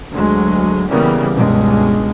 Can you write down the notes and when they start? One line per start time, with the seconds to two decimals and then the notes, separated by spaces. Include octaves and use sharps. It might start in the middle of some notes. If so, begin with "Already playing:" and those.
0.12 D2 F#3 G#3
0.89 C#3 E3 G3 A#3 B3
1.34 C#2 G2 B2 G#3